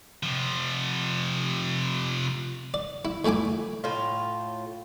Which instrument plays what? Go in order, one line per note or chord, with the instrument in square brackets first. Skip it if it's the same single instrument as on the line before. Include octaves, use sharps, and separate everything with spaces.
[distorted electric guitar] C3 F3
[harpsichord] D5
E4
F2 A3 E4 G#5 D6
[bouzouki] A2 F4